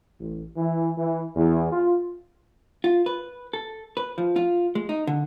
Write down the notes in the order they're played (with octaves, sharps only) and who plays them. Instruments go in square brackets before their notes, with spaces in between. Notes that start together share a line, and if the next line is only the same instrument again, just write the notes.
[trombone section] A1
E3
E3
E2
F4
[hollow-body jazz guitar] F4
B4
A4
B4
F3
F4
G#3
D#4
D3